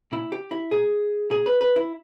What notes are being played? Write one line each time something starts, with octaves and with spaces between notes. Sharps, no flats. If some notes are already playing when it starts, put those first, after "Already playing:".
A#2 E4
G4
E4
A#2 G#4
A#2 G#4
B4
B4
E4